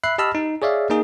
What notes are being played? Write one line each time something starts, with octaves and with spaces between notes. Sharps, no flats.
E5 B5 F#6 C7
G4 D#5 A5 B5 E6 F6
D#4
G#4 C#5 D5 E5 F5
A#3 D#4 G#4